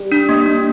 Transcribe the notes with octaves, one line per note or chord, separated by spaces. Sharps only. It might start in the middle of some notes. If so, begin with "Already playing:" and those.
Already playing: G3
D4
A#3
D4